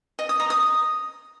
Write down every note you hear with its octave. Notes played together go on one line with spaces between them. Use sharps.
D#5
D#6
A#5
D#6